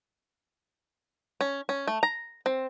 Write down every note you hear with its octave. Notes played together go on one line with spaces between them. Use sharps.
C#4
C#4
A3
A#5
C4